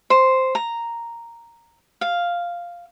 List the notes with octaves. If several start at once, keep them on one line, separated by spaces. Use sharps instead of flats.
C5
A#5
F5